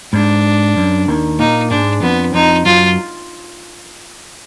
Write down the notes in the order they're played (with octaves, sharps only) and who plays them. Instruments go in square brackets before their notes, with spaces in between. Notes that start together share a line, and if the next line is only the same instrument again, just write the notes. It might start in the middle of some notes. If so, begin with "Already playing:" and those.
[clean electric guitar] G#2 [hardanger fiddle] D4
[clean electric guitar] F#2
D#2 D#3
[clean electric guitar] A#2 A#3 [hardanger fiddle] D#4
[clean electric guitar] G#2 G#3 [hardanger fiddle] D4
[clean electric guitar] F2 F3 [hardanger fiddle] B3
[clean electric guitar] F2 F3 [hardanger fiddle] D#4
[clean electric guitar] F#2 F#3 [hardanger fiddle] F4